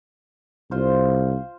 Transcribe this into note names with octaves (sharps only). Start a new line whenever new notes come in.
C2 F4 C5